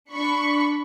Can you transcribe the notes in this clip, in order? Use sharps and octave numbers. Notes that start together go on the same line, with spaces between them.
D4 B5 C#6